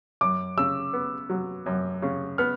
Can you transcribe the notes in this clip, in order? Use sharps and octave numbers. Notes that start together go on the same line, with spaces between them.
F#2 D6
C#3 E6
B3
F#3
F#2
C#3
B3 F6